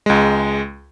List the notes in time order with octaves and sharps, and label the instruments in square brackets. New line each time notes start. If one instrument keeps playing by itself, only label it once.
[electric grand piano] C#2 G#3